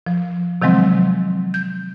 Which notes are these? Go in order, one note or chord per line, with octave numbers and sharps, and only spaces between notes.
F3
C3 D#3 F3 F#3 G#3 C4
G6